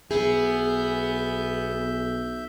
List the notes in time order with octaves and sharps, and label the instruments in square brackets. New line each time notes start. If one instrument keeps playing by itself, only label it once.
[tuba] B1 [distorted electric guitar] B3 [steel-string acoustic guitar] G#4 [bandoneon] E5 G6